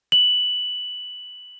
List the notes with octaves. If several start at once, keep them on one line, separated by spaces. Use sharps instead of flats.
F#7